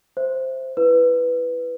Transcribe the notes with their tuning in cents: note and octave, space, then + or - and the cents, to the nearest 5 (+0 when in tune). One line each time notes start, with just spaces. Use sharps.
C5 +0 E5 +0
E4 +20 B4 +0